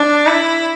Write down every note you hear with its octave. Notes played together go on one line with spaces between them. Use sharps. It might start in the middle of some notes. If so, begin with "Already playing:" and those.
Already playing: D4
E4